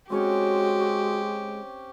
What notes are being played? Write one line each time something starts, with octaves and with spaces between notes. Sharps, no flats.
G#3 C4 C#4 F#4 G4 C#5